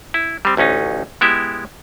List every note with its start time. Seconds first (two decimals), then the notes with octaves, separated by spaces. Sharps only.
0.14 E4
0.45 G3 C4
0.57 A1 D2 C#4 D#4
1.21 G#3 B3 E4 G4 E5